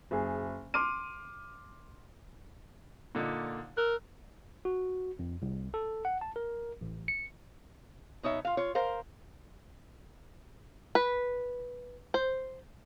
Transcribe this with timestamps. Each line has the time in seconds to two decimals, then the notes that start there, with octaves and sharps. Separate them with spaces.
0.11 F#1 G#4
0.74 C6 D6 F6 D#7
3.15 A#2 D3 D#4
3.77 A#4 E6 F#6
4.65 F#4
5.19 F2
5.42 C2
5.74 A4
6.05 F#5
6.21 A5
6.36 A#4
6.81 A1
7.08 C#7
8.23 B2 D#4 C#5 E5
8.45 F4 F5
8.57 F4 C#5
8.75 A#4 C5 F5
10.95 B4
12.14 C5